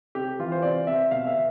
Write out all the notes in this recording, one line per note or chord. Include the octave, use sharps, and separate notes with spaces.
C3 G4
E3 F4
C5
C3 D5
C3 E5
B2 F5
E5
B2